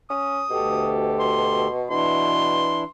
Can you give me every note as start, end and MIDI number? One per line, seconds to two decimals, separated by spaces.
0.10 0.43 61
0.10 0.93 87
0.51 1.68 38
0.51 1.87 47
0.51 1.68 67
0.51 1.68 69
1.20 1.75 84
1.90 2.71 47
1.90 2.84 52
1.90 2.84 62
1.90 2.84 64
1.90 2.88 84